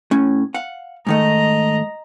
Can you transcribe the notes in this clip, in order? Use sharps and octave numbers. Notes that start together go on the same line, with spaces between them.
A2 C#4
F5 F#5
G#2 D#3 A3 D#5 A#5